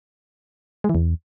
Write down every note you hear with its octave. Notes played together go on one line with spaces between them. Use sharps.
G#3
E3
E2